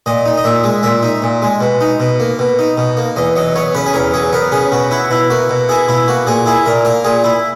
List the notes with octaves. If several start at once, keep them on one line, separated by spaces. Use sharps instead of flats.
A#2 D#5
D#4
D#5
A#2 E5
G#3
A#2 E5
D#4
A#2
G#3
B2
D#4
B2
A#3
B2
D#4
B2
A#3
E2 D#5
F#3 D#5
B3 C#5
C#3 B4
G#4
E2 A#4
F#3 G#4
B3 A#4
C#3 G#4
B2 F#4
E4 F#4
B2 E4
A#3 F#4
B2
E4 G#4
B2 E4
A#3 F#4
A#2 G#4
E4 G#4
A#2 A#4
A#3 A#4
A#2 G#4
E4